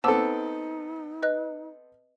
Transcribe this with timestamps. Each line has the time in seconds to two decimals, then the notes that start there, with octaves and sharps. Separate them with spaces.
0.04 B3 C4 D#4 A4 A5 D6 E6
1.23 B4 D#5 F#6